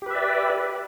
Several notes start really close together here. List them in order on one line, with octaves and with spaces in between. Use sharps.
G4 B4 E5 D5